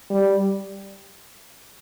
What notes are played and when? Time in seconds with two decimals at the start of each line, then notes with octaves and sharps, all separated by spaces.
0.10 G3